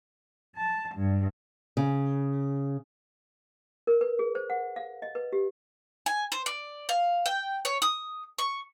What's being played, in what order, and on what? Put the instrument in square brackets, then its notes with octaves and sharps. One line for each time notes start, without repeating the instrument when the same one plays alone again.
[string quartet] A5
G2
[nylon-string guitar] C#3
[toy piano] A#4
B4
G#4
C5
F#5
F5
D#5
B4
G4
[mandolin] G#5
C5
D5
F5
G5
C#5
D#6
C#6